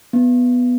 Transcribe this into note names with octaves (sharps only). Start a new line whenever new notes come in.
B3